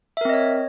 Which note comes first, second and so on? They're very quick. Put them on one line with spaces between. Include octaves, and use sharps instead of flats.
E5 A#4 C4 D#5 C#5